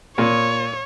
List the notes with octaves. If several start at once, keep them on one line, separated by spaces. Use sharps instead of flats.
A#2 C#5